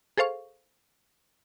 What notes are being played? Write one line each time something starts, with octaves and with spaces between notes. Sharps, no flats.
G#4 A4 C5 F5 C#6